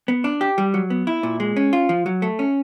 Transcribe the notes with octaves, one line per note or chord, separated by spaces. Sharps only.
B3
D4
G4
G3
F#3
B3
E4
A#2
G#3
C#4
F4
F3
F#3
A3
C#4